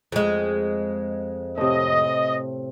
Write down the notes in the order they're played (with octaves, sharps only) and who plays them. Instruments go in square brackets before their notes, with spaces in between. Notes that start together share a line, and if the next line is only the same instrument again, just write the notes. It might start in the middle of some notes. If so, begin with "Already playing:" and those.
[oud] F2 G#3
[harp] A2 C3 [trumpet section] D#5